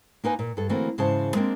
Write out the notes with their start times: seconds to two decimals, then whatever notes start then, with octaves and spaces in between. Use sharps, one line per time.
0.24 A#3 D#4 B4 G#5
0.39 A#2
0.57 G2 A4
0.69 D3 E3 A3 A#3 C4 F#4
0.98 G#2 C#3 E3 C5 A5
1.34 G#3 A#3 C4 D4